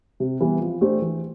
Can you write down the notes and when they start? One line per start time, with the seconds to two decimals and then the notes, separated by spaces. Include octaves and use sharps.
0.20 C3
0.41 E3 G3 B3
0.61 F3
0.81 A3 D4 G4 C5
1.02 E3